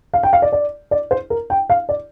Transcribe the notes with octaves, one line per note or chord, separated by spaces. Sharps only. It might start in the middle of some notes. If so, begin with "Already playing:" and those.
F5
G5
F5
D5
D5
D5
C5
A#4
G5
F5
D5